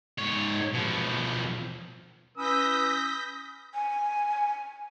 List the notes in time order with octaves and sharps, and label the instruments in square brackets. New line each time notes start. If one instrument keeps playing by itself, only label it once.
[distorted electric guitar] G#2 C#5
B2 F3
[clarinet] C#4 [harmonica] B4 E6 [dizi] D#6 [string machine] G6 A#6 B6
[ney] G#5